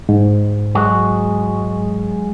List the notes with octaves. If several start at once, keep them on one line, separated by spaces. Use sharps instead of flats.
G#2
F#3 G#3 F#4